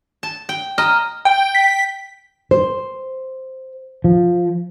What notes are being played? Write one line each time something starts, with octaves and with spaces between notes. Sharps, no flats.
A5
G5
D#5 A#5 F6
G5
B6
C5
F3